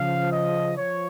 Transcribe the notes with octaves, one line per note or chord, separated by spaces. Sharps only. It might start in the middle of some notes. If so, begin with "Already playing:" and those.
Already playing: C#3 F3 F5
D#5
F3 C#5